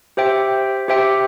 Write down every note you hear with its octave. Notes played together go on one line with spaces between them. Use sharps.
G4 C5 E5 G5
G4 C5 E5 G5